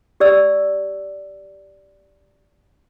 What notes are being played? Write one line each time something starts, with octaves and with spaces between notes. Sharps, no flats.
G4 D5 E6